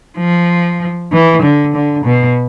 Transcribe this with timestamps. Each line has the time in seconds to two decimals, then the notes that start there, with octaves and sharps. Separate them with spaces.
0.18 F3
1.12 E3
1.43 D3
1.74 D3
2.05 B2